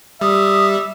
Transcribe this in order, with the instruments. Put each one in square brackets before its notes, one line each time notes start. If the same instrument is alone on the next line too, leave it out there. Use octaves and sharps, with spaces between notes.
[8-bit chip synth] G3 [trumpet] E5 [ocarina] D#6